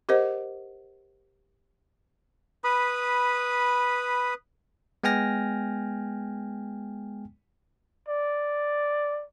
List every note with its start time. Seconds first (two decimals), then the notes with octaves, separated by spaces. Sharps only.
0.09 G4 A#4 C5 D#5 F#5
2.64 B4 B5 D#6
5.04 G#3 B3 G5 G#5 F6 A#6
8.08 D5